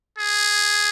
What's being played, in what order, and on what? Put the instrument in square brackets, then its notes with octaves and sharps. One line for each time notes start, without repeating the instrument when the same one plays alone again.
[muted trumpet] G#4